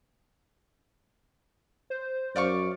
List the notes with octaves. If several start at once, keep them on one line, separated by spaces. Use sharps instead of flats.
C5
F#2 D5 F5 C#6